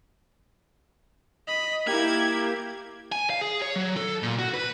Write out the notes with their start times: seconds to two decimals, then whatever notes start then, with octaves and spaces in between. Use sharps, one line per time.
1.47 D#5 B5
1.86 A#3 E4 G4 G#6
3.12 G#5
3.30 F5
3.41 G#4
3.62 C#5
3.76 F#3
3.97 A4
4.23 A#2
4.39 F#4
4.54 B4